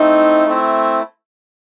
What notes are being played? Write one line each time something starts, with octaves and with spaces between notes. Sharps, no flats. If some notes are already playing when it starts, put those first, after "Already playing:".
Already playing: A3 C4 D#4 E4
A3 C4 E4